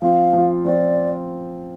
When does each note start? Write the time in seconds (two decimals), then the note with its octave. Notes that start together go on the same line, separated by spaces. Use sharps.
0.02 F3 C4 F4 F5
0.33 F3 C4 F4
0.65 F3 C4 F4 D5